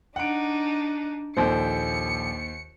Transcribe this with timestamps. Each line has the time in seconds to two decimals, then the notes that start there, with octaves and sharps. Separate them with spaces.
0.16 D4 D#4 F#5 D7
1.37 A#1 D#2 A4 C5 C#7